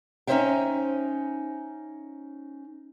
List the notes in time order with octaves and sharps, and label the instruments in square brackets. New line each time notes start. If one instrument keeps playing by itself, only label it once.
[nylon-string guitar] C#4 D#4 A4 C5 E5 G5